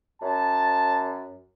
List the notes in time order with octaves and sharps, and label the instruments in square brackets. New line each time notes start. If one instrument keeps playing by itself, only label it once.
[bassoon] F#2 [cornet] A5